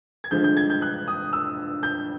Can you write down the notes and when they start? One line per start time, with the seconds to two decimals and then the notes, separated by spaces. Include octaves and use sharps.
0.24 G#6
0.31 G2 D3 F3 G#3 G6
0.44 G6
0.57 G#6
0.70 G6
0.82 F#6
1.08 D#6
1.33 E6
1.83 G6